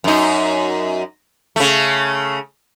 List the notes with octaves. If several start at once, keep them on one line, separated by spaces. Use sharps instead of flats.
F#2 D#4
C#3 A3